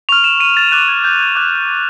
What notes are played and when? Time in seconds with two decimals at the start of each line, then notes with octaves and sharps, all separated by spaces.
0.09 C#6 F6 F7
0.24 E7
0.40 D#7
0.57 A6
0.72 D6 F#6 A6
0.88 G#6
1.04 G6
1.20 G6
1.35 D6 F#6